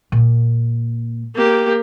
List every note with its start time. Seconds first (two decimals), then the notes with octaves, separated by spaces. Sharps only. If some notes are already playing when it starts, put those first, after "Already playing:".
0.12 A#2 A#3
1.35 A#3 G4